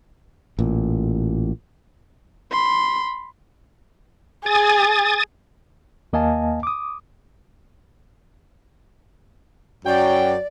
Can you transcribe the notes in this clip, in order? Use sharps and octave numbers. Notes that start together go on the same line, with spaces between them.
A1 A#2
B5 C6
G#4 G#5 D#6 A6
D#2 A#3 D#5 F5 G#5 A5
D6 D#6
F#2 F#3 D5 G5